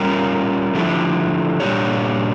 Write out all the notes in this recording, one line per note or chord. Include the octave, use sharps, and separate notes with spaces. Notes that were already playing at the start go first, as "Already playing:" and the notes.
Already playing: G3 C#4 F4 A#4
D3 F3 A3 E4 G4
A#2 G3 D4 G4 C#5